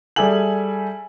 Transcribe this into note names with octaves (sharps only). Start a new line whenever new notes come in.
G3 G#4 A4 E5 G#5 F#7